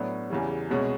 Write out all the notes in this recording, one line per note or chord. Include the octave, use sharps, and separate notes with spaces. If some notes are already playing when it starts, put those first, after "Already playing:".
Already playing: A2 F#3 B3 D4
E2 C#3 E3 G3
C2 B2 G#3 C#4